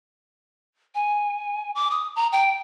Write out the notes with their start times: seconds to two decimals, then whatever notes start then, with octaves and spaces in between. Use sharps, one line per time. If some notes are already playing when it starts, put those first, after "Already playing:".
0.95 G#5
1.75 D6
1.91 D#6
2.16 A#5
2.32 G5